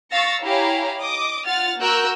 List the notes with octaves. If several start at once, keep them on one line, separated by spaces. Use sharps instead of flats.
F5 C#6 E6 A6 A#6 C#7
E4 G4 C#5 F5 G#5 A#5
D#5 D6 D#6
F4 F#5 F6 A6
A#3 F#4 A#4 E6 F#6 G6